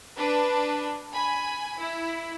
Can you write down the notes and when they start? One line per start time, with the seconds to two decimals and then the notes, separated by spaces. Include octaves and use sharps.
0.16 D4 B4
1.12 G#5 B5
1.80 E4